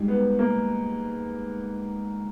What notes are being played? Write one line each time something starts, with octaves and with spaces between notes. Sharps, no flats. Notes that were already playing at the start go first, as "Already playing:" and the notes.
Already playing: G#2 G3
B3
A#3